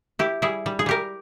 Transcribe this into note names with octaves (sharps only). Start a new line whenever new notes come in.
E4 G4
G3 E4 G#4
G3
G#4
G3 G4 A#4